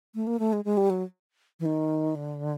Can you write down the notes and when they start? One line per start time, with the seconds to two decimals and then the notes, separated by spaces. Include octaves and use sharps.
0.15 A3
0.27 A#3
0.39 A3
0.53 G#3
0.65 G#3
0.77 G3
0.90 F#3
1.60 E3
1.66 D#3
2.15 D3